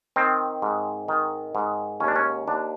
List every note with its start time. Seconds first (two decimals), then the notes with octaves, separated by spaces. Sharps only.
0.16 D#3 C4
0.62 G#2
1.08 D#3
1.55 G#2
2.00 D#2 C#4
2.08 D4
2.16 C#4
2.48 D#2 D4